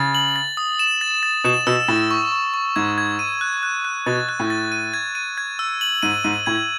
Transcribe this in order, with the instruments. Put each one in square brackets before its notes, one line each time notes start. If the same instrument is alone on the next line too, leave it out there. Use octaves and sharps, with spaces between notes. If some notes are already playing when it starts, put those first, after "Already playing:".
Already playing: [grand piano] C#3 [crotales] A6
[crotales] F#7
A6
D#6
E7
A6
A6
[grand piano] B2 [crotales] E7
[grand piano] B2 [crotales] E6
[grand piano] A2 [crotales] A6
[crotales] C#6
C#6
C#6
[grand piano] G#2 [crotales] G#6
[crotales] G#6
D#7
F#6
F#6
F#6
[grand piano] B2 [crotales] A6
[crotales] F#6
[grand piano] A2
[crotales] A6
D#7
G#6
D#7
G#6
E6
F#7
[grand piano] G#2 [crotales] D#7
[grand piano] G#2 [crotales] D#7
[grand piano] A2 [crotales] G#6